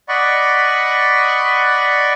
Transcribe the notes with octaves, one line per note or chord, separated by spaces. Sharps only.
D5 D#5 F#5 B5 C#6